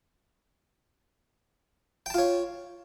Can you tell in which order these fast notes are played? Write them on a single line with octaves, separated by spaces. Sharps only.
G5 A5 F4 C#5